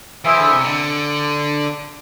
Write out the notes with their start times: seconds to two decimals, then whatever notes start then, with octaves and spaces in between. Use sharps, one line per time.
0.24 E3 E4 G#4 C5 E5
0.38 D3
0.51 C3
0.64 D3